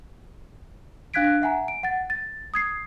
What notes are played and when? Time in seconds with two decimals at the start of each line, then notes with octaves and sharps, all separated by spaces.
1.14 D4 F5 F#6 G#6 B6 D7
1.42 E5 F#5 G#5 A#5
1.68 D7
1.83 F#5 A6
2.10 A6
2.54 D#6 G#6 C7